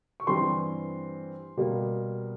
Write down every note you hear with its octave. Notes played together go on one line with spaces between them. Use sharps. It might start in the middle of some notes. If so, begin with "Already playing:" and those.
C#6
G2 E3 G3 C4 C6
B2 G3 A#3